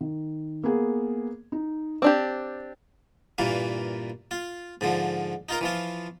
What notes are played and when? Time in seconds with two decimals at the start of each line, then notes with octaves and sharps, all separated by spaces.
0.01 D#3
0.63 A#3 B3 G#4
1.52 D#4
2.02 C4 D4 G4 D6
3.38 G2 A#2 E3 A#3
4.31 F4
4.81 G#2 D3 F3
5.49 D#4 F4 A#4
5.61 E3 F3 F4